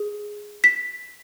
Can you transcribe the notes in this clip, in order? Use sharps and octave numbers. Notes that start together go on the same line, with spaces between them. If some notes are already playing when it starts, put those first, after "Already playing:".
Already playing: G#4
B6